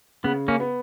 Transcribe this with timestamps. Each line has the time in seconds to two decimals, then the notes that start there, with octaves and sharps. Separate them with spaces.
0.24 C#3 B3
0.48 A#3 C#4
0.60 B3